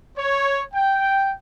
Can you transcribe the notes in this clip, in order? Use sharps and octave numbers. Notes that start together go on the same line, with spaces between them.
C#5
G5